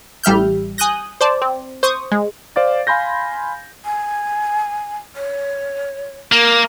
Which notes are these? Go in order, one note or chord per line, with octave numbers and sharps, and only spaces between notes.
A1 G3 E5 F6 G6
G#5 D#6 F#6 G6 A#6
C5 D5 A5
C4
C5 C#6 D#6
G#3
C5 D5 F5 D6 A6
F5 G#5 B5 C6 G6 A#6
G#5
C#5
A#3 A#4